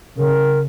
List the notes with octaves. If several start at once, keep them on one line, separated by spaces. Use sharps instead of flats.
C#3 A#4